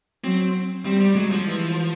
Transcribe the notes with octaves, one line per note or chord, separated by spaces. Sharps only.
F#3 C4
G3 C4
G3
F#3 G#3
F3
E3